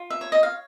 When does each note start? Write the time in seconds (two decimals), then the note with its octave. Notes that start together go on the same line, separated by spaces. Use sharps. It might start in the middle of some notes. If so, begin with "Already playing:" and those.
Already playing: F4
0.10 E5
0.21 C#5
0.32 D#5
0.43 F5